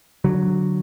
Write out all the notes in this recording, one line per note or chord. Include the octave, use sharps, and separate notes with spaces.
D3 F#3